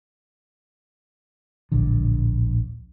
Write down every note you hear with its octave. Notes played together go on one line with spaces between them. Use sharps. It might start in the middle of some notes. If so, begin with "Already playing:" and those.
D1 A#1 D3